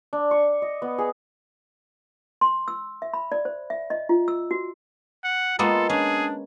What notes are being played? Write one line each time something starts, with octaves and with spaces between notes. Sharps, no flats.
D4
C#6
D#5
B3
G#4
C6
E6
E5
B5
D5
C5
E5
D#5
F4
E6
F#4
F#5
G#3 A#3 B3 F4 A4
C#4 D4 G#4